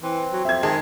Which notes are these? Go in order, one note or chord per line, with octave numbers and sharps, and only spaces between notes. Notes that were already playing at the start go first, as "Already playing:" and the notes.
E3 C4
F#3
F2 E5 G#6
D#3 G#3 A5